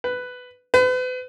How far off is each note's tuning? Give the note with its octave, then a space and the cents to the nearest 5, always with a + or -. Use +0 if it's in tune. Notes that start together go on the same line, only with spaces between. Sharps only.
B4 +10
B4 +40